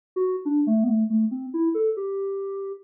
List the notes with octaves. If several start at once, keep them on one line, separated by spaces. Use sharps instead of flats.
F#4
D4
A3
B3
A3
A3
C4
E4
A4
G4